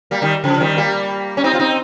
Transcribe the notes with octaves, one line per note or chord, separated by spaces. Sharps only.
G3 A#3
D#3 G3
C#3 F3
D#3 G3
G3 A#3
C#4
C4 D#4
F4
C4 D#4